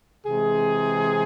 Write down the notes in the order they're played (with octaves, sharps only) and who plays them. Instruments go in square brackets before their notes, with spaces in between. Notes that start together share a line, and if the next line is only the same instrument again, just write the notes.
[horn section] C3 E3 G#3 G#4